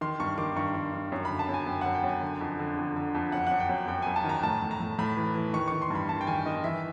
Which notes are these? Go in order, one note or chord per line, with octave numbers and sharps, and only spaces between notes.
D#3 C6
G2 C#6
D#3 D6
G2 C#6
D#3
D#3
F#2
D3 B5
A5
F#2 G#5
F#2 G5
F#2 F#5
G5
F#2 G#5
D3
F2
D3
F2
D3
F2
F#2 F#5
F#2 F#5
G5
F#2
F#2 G5
F#2 G#5
A5
D#3 A#5
A2 A5
A2
A#5
A2
A2 B5
E3
E3
D#3 C#6
D#3 C#6
C6
G2
B5
D#3 A5
G5
D#3 G#5
D#3 D#5
E3 E5